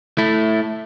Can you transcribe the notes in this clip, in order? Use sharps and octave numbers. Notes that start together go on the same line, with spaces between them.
A3 E4